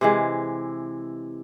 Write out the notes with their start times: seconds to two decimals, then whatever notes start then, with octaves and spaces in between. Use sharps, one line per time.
0.01 C3 E3 G#3